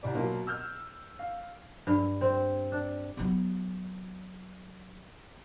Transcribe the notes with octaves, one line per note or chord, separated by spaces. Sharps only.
C2 G3 D5
B2 F#3 A#3 F4
E6 F6 G6
F5
G2
C4
D4
F#3 B3